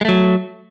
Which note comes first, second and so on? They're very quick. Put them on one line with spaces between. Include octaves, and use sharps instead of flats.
G#3 A3 F#3